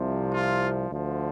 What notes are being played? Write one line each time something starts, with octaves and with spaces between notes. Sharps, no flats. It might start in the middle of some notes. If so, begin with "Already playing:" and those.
Already playing: C2 C3 F3
F4
D2 D3 F3